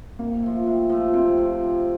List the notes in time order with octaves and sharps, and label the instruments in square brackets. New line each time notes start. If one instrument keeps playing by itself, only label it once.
[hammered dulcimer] C3 [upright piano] A#3
[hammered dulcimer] F3 A3
C3
F3 A3
[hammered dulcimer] C3 [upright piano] C4
[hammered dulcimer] F3 A3
C3